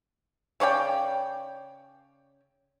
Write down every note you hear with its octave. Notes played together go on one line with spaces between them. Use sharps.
C#3 C#5 D5 G5